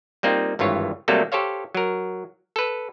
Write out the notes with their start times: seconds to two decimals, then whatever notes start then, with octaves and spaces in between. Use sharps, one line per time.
0.23 G3 A#3 C4 D#4 F4
0.59 G#1 G2 E3 F4 C#5
1.08 C3 F#3 G3 A3 A#3 A4
1.32 G4 A4 C5 C#5 F5
1.75 F#3 A#4
2.56 A4 B4